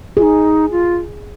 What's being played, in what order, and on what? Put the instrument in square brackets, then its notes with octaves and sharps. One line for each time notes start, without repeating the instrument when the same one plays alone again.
[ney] F4 [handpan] G#4
[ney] D#4
F4